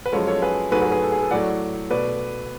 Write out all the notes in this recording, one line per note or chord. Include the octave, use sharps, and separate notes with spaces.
B4
F#2 F3 G#3 A4 C#5
A4 C#5
G#4 B4
G#2 F#3 A3 G#4 B4
G#4 B4
G#4 B4
A4
G#4
A4
A2 F#3 A3 D5 F#5
B2 A3 B4 D5